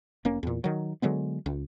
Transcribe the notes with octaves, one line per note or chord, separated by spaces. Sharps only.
F1 A#3 C#4
E2 A#2
D#3 F#3
D3 F#3 G#3 B3
C#2